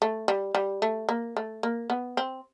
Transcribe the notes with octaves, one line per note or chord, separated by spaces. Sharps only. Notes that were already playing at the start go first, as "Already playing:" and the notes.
A3
G3
G3
A3
A#3
A3
A#3
B3
C4